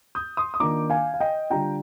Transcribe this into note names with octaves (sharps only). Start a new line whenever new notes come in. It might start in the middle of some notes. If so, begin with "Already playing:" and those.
D#6 G6
C6 D#6
D#6
D#3 A#3 D4 F4 A#5 D6
F5 G#5
F5
D#5 G5
D3 G3 D4 F4 G5 A#5